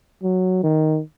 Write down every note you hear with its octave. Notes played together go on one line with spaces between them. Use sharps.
F#3
D#3